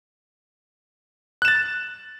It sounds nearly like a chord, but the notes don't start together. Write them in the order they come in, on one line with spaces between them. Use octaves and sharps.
F#6 E7 A6